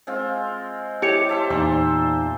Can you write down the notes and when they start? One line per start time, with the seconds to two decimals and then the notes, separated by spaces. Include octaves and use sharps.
0.07 G#3 C4 F4
1.02 E4 G4 C#5 D6
1.29 C5 E5 A5
1.50 E2 A#2 D#4 C5 D5